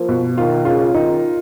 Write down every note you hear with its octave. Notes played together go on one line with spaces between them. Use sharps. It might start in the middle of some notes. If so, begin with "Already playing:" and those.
Already playing: F3 A#3
B2
D#3 F4
C#3 F4
D#3 D#4